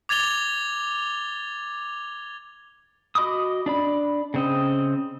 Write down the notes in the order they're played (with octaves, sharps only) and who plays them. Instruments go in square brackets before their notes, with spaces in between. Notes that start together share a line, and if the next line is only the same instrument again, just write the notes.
[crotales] D6 G#6 A6 F7 G7
[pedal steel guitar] F#4 D#5 B5 D6 D#6
D4 D5 B5
C#3 C4 D#5